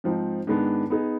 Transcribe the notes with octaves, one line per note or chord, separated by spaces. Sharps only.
G#2 F3 C4 D#4
G#2 D#3 G#3 B3 D4
B3 D#4 G#4